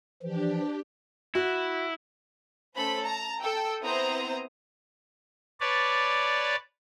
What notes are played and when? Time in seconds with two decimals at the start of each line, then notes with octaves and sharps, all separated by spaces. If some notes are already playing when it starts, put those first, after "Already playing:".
0.23 E3 F3 D4 G4
1.35 E4 F#4
2.76 A3 C#4 A4 C5 B5
3.05 A5 A#5
3.42 A4 G5 E6
3.82 B3 C4 E4 C5 A#5 D#6
5.60 B4 C#5 D5 A5